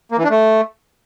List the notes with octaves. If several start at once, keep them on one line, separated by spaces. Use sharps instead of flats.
A#3
E3
D4
A3